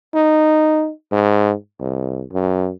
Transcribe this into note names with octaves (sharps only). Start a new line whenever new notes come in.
D#4
G#2
C2
F#2